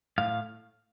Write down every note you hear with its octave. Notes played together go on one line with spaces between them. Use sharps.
A2 F5